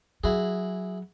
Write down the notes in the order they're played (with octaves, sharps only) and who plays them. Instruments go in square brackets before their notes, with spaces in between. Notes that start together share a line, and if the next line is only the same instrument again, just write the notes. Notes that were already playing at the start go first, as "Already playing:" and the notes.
[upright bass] F#3 [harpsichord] E4 F#4 G#4